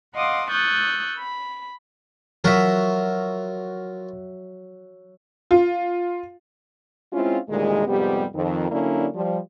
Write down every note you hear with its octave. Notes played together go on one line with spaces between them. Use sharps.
D#5 F5 F#5 C6 D6 D#6
C#6 D#6 E6 F#6 G6 A6
B5
F#3 F4 F#4 A#4 E5
F4
G#3 C4 C#4 E4 F4
D2 A#2 D#3 G3 G#3
F2 G#2 C3 G3 B3 G4
F2 D#3
D3 F#3 A#3 C#4 D4 E4
F3 G3